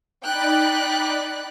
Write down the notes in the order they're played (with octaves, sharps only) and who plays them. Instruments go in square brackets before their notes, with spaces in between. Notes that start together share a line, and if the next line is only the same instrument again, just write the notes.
[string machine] D#4 D5 B5 [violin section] G5 F#6